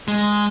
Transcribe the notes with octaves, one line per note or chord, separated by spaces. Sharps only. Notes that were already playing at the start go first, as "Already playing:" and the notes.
G#3